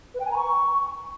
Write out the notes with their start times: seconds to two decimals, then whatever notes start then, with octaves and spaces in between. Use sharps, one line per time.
0.14 B4
0.20 G5
0.26 G#5
0.31 A#5
0.37 C#6